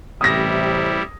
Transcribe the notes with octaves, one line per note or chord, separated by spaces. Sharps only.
A1 C3 G3 E4 D#6 A#6